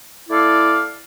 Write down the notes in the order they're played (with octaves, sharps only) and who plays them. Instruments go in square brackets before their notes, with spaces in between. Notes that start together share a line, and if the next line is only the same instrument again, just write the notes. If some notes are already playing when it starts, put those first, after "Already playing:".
[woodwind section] A3 E4 A4 D5 F5